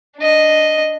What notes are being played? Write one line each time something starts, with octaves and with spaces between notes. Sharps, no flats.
D4 D#5